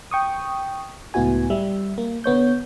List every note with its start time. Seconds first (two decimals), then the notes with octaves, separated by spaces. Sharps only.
0.11 G5 C#6 D#6
1.14 C#2 A2 B3 E4 F#4 G#5
1.50 G3 E5
1.98 A#3
2.24 D3 B3 C#5 G6